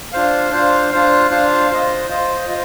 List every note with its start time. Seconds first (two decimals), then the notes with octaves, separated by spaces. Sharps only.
0.12 D4 F4 C5 F5
0.51 D4 F4 C5 F5
0.92 D4 F4 C5 F5
1.30 D4 F4 C5 F5
1.70 F4 C5 D#5
2.09 F4 C5 D#5
2.49 F4 C5 D#5